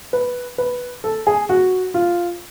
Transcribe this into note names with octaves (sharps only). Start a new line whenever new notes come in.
B4
B4
A4
G#4
F#4
F4